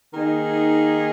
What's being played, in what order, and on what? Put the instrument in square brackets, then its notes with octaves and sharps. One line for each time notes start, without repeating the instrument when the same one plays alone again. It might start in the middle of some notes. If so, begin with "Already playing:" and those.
[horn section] D#3 A#3 D#4 G#4